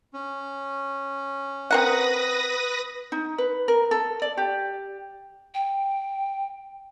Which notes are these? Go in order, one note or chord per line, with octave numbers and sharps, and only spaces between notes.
C#4
C4 A#4 B4 F#5 D#6 A#6
D#4
B4
A#4
A4
D5
G4
G5